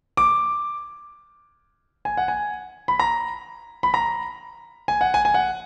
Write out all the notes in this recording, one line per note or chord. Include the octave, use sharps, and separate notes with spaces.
D6
G#5
F#5
G#5
B5
A#5
B5
A#5
G#5
F#5
G#5
G#5
F#5